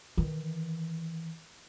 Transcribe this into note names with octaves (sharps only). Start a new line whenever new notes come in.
D#3 E3